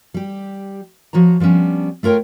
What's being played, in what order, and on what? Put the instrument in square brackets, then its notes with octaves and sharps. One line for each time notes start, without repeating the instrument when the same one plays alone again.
[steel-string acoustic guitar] G3 G4
F3 F#4 C#5 A#5
F3 G3 B3 C#4 D4
A3 F4 A#4 C#5 G5